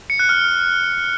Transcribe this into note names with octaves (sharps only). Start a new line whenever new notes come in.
C#7
F#6
F6